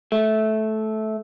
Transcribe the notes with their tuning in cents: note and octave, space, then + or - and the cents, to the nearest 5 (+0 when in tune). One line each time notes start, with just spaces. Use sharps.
A3 -15